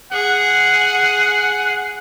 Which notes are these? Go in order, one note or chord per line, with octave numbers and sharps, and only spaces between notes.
G#4 F#5